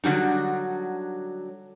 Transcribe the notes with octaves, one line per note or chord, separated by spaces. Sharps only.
D3 F#3 G3 D#4